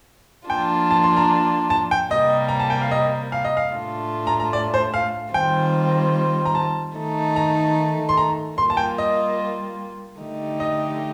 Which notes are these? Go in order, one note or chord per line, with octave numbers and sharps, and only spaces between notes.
F3 A#3 D4 F4 G5
A5
C6
A#5
A5
G5
C3 G3 A#3 D#5
A#5
A5
G5
F5
D#5
F5
D#5
F5
A2 A3 D4 F4
A#5
A#5
D5
C5
F5
D#3 G3 C4 F4 G5
A#5
A5
D#3 A3 D#4
A#5
C6
A#5
G3 A#3 F4 C6
A5
G5
D#5
D3 A3 D#4 G4
D#5